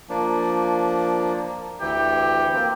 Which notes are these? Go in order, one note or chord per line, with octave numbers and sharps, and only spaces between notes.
F3 A#3 D4
D2 E3 G4
A#3 C4